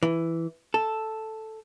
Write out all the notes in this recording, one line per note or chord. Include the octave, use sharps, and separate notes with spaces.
E3
A4